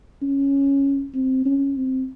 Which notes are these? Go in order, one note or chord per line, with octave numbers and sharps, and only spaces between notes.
C#4
C4
C#4
C4